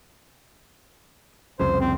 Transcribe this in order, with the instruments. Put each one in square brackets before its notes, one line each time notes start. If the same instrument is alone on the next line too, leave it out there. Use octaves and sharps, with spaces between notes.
[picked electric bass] C2 F2 C#3 [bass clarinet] C5
[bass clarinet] C4